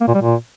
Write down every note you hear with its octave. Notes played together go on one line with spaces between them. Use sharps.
A#3
A#2
G3
A#2